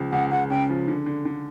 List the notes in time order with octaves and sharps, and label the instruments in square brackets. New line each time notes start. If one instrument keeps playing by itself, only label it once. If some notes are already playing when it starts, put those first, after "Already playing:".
Already playing: [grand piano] C#2 F3
[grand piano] C#2 [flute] F#5
[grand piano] C#2 [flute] F#5
[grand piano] C#3 [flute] G5
[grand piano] F3
D3
D3
D3